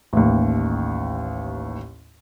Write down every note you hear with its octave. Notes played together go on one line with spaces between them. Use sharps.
A1 D#2